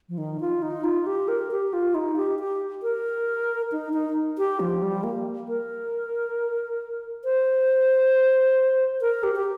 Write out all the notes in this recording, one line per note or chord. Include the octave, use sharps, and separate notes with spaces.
F3
D#3
F4
D#4
F4
G4
A#4
G4
F4
D#4
G4
G4
A#4
D#4
D#4
G4
F3
G3
A#3
A#4
C5
A#4
G4
G4